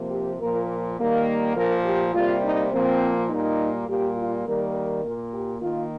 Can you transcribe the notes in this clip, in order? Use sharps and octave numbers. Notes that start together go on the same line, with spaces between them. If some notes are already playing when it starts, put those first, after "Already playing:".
Already playing: C3 F3 A#3
G4
A#2 F3 A#3 A#4
D#3 G3 A#3
A#2 F3 A#3 A#4
G4
C3 G3 A#3 F4
D#4
A#2 F3 A#3 C4
A#2 G3 A#3 D#4
A#2 G3 A#3 G4
F4
D#3 G3 A#3 A#4
A#4
A#2 A#3
G4
D#3 A#3 F4